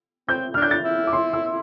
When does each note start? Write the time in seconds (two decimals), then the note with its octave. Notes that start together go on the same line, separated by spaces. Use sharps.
0.29 C4 G6
0.54 D4 F6
0.62 G6
0.71 A6
0.85 E4
1.07 D6
1.13 C6
1.33 E6